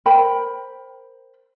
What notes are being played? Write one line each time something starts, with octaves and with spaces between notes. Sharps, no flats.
A#4 C5 G5 B5